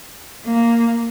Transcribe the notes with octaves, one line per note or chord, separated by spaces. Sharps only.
A#3